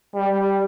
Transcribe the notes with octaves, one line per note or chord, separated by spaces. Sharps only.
G3